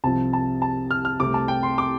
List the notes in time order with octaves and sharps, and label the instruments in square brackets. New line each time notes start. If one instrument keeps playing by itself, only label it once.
[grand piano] C2 C3 F3 C4 A5
A5
A5
F6
F6
C2 C3 A3 C4 D6
A5
G5
C6
D6